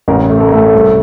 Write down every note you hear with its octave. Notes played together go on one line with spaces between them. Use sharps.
A1 A#4
A3
A4
A#4
A3 A4
C2